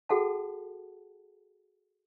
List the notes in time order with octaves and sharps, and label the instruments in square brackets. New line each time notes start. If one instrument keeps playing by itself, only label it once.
[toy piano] F#4 G#4 A4 F#5 G5 A5